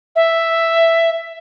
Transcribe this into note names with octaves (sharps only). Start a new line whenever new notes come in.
E5